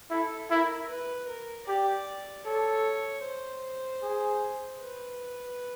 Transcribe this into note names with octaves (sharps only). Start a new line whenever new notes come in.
E4 A4
E4 A#4
B4
A#4
G4 D5
A4 C#5
C5
G#4
B4